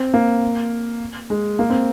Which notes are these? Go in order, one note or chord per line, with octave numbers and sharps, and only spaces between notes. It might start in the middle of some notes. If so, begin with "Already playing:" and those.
Already playing: C4
A#3
G#3
A#3
C4